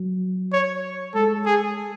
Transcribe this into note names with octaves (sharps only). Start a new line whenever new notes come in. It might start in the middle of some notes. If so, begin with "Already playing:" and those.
Already playing: F#3
C#5
G#3 A4
G#4